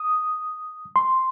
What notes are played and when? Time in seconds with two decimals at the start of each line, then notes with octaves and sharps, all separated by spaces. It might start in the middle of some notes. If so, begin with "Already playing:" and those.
Already playing: D#6
0.96 C6